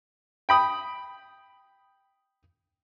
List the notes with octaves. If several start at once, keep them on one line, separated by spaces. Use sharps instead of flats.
G5 B5 D#6